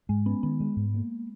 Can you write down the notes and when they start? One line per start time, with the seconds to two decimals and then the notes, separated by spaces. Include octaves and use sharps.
0.09 G#2 G#3
0.26 B3 C#4
0.43 D#3 B3
0.60 G#3
0.77 G#2
0.94 A#3